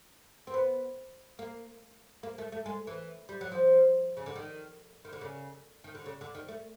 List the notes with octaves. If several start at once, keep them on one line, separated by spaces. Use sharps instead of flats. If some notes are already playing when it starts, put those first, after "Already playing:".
C4
B3
A#3
A#3
A3
A3
G#3
E3
G3
F#3
F3
C#3
D3
D#3
D#3
D3
C#3
D#3
D3
C#3
D3
D#3
A3